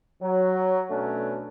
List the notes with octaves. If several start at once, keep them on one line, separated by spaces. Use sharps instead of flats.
F#3
B2 A3 C#4 D4